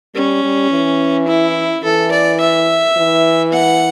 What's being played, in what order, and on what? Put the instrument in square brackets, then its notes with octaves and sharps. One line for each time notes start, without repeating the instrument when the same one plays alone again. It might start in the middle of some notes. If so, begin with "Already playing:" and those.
[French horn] G3 [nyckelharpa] C#4
[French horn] G3
E3
[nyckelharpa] E4
[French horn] E3 [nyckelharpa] A4
[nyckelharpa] D5
E5
[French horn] E3
[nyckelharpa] F#5